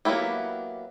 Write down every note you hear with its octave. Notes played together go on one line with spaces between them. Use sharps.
F#3 A#3 B3 E4 G4